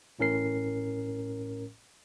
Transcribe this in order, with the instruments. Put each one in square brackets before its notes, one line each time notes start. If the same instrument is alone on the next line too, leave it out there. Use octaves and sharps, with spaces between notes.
[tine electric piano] A1 A2 C#4 A#4 C7